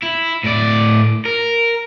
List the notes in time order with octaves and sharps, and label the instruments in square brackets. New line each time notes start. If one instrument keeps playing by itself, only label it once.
[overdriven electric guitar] E4
A2 D5
A#4